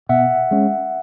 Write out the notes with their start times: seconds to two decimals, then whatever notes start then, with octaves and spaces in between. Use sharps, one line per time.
0.09 B2 E5 F#5
0.51 G#3 C#4